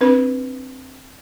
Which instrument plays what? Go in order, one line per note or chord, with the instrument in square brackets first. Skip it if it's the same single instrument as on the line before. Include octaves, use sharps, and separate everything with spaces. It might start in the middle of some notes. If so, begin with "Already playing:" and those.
[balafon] C4 D4 B4